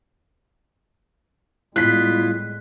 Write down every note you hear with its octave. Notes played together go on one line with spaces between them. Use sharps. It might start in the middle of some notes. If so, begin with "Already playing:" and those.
A2 G3 G#3 B3 E4 F4 F#6 B6